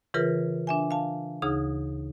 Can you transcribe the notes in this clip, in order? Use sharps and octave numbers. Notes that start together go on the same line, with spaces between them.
C#3 E3 F4 G#4 A#4 B4
D4 E5 G#5
F5 A5
D2 C#3 D#4 G#4 D#6